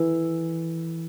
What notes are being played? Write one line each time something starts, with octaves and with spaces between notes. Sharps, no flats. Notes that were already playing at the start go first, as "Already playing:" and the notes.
Already playing: E3 E4 A4